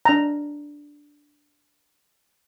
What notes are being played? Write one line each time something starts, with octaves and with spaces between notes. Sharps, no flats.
D4 A#5